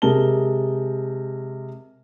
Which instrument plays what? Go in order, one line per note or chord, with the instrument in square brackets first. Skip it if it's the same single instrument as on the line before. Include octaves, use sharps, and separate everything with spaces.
[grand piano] C3 G#3 A#4 A5 G7